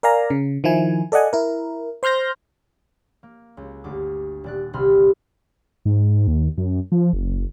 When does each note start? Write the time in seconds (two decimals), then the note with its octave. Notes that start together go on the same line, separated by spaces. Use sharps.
0.03 A#4 D5 F5 G#5 A#5
0.30 C#3
0.64 D#3 F3 E4 G#5
1.12 A4 D5 D#5 F#5 G#5
1.33 E4 A#4
2.03 C5 C6 F6 G6 A#6
3.23 A#3
3.57 C#2
3.84 G1 D2 D6
4.44 D#1 D5 F#6
4.73 G1 C2 C3 B5 C6 F6
5.85 G#2
6.27 D#2
6.58 F#2
6.92 F3
7.13 F#1